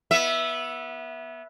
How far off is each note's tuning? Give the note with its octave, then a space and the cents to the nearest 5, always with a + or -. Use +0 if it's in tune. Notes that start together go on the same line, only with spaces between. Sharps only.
B3 -20 E5 +0